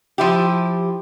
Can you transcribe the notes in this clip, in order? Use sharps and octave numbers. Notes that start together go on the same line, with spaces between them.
F3 E4 G4